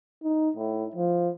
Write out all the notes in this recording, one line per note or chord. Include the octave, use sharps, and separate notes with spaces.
D#4
A2
F3